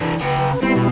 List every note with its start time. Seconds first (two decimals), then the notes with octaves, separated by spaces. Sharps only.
0.01 E3 D4
0.21 C#3 B4 G5
0.63 G3 B3 C4 E4
0.77 B2